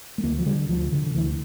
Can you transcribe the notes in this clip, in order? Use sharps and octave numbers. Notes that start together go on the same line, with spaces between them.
A3
D2 A#3
F3
D3 G3
D2 F3
D3
D3
D2 E3